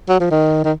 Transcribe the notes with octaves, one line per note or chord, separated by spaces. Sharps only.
F#3
F3
D#3
D#3